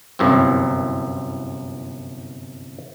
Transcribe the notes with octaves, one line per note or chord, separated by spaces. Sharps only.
G1 C2 F#2 E3 C4